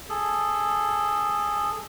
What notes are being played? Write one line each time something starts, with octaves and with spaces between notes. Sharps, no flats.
G#4 A4